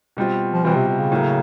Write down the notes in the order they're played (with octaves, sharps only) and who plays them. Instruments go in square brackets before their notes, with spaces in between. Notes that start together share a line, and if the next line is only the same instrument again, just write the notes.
[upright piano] B2 G3 C4 F4
[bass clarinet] F3
[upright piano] B2 G3 C4 F4 [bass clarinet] E3
[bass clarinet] C3
C3
C#3
[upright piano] A2 F#3 A#3